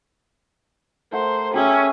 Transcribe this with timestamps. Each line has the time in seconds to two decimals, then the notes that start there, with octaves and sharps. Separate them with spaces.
1.12 A3 A#4 C5 F#5
1.54 C#4 G4 G#4 E5